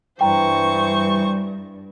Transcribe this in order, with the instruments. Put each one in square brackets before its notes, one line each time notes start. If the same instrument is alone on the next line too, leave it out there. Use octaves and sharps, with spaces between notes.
[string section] G2 [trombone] E3 [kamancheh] C5 C#6 [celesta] G5 A#5